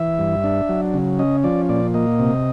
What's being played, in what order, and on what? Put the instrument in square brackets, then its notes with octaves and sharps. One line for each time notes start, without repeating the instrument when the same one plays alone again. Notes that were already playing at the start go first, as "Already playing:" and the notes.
Already playing: [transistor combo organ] E3 E5
G2
D4
F#3
C#3
C#4 D#5
F3 D5
A#2 D5
A#3 D#5
C3